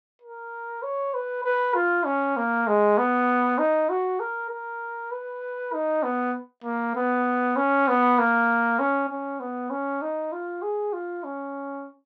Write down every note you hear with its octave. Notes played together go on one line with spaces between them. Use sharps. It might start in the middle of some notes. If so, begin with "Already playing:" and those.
A#4
C#5
B4
B4
F4
C#4
A#3
G#3
B3
D#4
F#4
A#4
A#4
B4
D#4
B3
A#3
B3
C#4
B3
A#3
C#4
C#4
B3
C#4
D#4
F4
G#4
F4
C#4